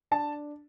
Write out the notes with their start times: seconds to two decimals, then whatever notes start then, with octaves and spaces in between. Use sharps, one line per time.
0.11 D4 A5